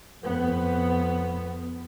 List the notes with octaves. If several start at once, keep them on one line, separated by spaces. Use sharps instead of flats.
F2 B3